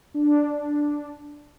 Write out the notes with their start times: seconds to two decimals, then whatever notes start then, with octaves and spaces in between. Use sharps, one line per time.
0.14 D4